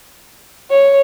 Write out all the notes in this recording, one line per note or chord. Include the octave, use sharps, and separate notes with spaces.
C#5